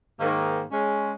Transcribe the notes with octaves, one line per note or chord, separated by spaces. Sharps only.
G#2 D#3 A#3
G#3 C#4